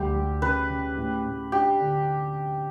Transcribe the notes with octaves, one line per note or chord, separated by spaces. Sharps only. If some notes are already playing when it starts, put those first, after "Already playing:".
Already playing: D2 G3 G4
G3
C#3 B4
C#3
A2
A2
D4 G4
D3